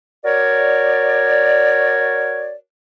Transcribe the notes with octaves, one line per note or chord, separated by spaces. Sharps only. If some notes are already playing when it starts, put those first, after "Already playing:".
F#4 A#4 C#5 D5